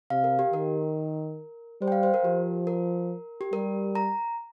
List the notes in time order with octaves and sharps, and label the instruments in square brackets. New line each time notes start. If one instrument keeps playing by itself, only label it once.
[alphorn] C3 [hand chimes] F5
[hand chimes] A#4
G4
[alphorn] D#3 [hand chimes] A#4
[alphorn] G3 [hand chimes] C5
[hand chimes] G5
F5
C5
A#4
[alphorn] F3 [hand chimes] G4
[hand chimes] A#4
G4
[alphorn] G3 [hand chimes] A#4
[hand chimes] A#5